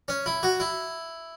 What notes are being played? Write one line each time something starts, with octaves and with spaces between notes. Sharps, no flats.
C#4
E4
F#4
E4